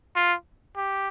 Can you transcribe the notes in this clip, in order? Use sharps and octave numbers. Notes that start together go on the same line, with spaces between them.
F4
G4